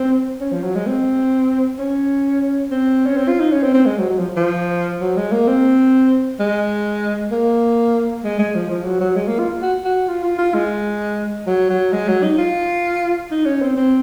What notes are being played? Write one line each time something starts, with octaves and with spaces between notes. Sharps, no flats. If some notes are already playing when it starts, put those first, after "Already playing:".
Already playing: C4
C#4
F3
F#3
G#3
C4
C#4
C4
C#4
C4
F4
D#4
C#4
C4
C4
G#3
F#3
F#3
F3
F3
F#3
G#3
A#3
C4
G#3
A#3
G#3
G#3
F3
F3
F#3
F#3
G#3
A#3
F4
F#4
F#4
F4
F4
F4
G#3
F#3
F#3
G#3
F#3
D#4
F4
D#4
C#4
C4
C4